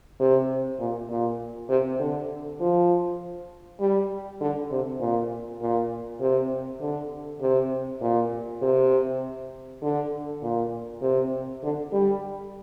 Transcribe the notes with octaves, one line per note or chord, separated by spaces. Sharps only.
C3
A#2
A#2
C3
D3
F3
G3
D3
C3
A#2
A#2
C3
D3
C3
A#2
C3
D3
A#2
C3
D3
G3